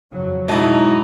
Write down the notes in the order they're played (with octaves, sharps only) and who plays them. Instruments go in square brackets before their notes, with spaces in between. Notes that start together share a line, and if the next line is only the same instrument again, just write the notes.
[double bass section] F2 C#3 F#3
[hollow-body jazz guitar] G#2 D#5 A5 [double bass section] B2 [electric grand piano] F#3 G#3 E4 [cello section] D#4